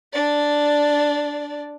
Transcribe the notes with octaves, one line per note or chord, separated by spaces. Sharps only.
D4 D5